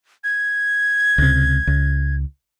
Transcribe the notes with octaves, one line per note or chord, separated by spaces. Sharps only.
G#6
C#2 C3
C#2